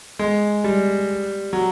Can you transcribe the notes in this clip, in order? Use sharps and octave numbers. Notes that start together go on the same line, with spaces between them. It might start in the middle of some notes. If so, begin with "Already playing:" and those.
G#3
G3
F#3